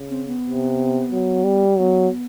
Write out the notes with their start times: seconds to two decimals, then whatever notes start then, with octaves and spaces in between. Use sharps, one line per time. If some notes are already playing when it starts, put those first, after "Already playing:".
Already playing: C#3
0.10 C4
0.27 B3
0.44 C3
1.12 F#3
1.44 G3
1.78 F#3 B3